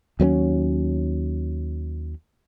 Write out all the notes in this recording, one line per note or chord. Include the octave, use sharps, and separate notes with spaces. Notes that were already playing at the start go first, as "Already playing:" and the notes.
D#2 F#3 A#3 C#4